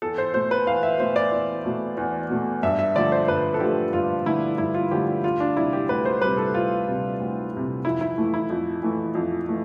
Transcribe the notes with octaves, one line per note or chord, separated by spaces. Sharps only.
E2 A4
C5
B2 A3 C5
B4
E2 F5
E5
B2 A3 C5
D5
E2
B2 A3
E2
B2 A3
G2 E5
E5
D3 F3 A3 D5
C5
G2 B4
A4
D3 F3 A3 G4
G2 F4
D3 F3 A3 E4
G2 E4
F4
D3 F3 A3 G4
D2 F4
D4
C3 G3 E4
G4
D2 B4
C5
C3 G3 B4
A4
D2 F4
C3 G3
D2
C3 G3
F2 E4
E4
E3 A3
E4
F2
E3 A3
F2
E3 A3